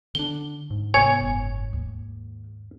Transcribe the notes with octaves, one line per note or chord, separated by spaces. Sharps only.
D3 D4 G7
G#2
C3 B3 C#5 G#5
F#1
D#2